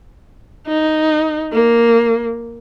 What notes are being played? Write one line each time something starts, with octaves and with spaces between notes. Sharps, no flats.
D#4
A#3